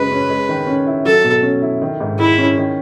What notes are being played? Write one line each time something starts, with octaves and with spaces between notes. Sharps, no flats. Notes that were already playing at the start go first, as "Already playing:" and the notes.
Already playing: F#2 C#3 G#3 B4
C#4
G#3
D#3
C#4
E4
F#3 A4
B2
C#4
E4
D#3
G#2
G#3 E4
C#4
D#3